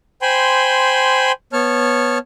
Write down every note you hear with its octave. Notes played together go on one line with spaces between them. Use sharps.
C5 G5 G#5 B5 C6
B3 C#5 A5 F6